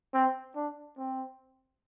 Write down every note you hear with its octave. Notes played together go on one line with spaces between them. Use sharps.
C4
D4
C4